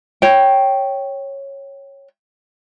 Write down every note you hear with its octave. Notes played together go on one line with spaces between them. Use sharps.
C#5 G5